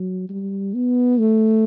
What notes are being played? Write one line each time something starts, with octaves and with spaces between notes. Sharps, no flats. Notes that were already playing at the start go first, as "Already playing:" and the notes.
Already playing: F#3
G3
B3
A3